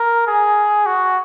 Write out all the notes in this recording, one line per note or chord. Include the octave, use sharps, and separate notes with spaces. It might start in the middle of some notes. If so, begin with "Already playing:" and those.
Already playing: A#4
G#4
F#4